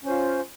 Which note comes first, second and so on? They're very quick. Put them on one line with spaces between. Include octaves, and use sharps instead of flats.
C#4 C5 F4